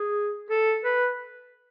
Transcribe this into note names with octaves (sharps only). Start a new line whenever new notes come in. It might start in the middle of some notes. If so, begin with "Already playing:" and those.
Already playing: G#4
A4
B4